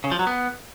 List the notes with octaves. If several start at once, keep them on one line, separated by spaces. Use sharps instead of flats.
C#3
F3
F#3
B3